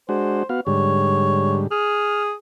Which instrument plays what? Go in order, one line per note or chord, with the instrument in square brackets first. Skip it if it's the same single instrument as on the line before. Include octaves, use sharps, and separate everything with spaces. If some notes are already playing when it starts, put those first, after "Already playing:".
[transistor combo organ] G#3 D4 F#4 [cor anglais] C5
[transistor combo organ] B3 F#4 F5
[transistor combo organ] G#2 D3 G3 [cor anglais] C#5
[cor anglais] G#4 [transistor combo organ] F6